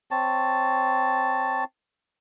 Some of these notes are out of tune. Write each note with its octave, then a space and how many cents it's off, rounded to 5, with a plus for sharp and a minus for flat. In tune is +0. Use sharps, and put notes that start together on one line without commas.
C4 +0 C#5 +0 A5 +0